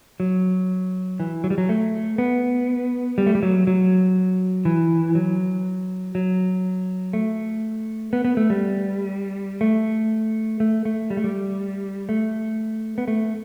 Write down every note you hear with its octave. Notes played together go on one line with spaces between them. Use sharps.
F#3
E3
F#3
G3
F#3
A3
B3
G3
A3
G3
F#3
F#3
E3
F#3
F#3
A3
B3
B3
A3
G3
A3
A3
A3
G3
A3
G3
A3
B3
A3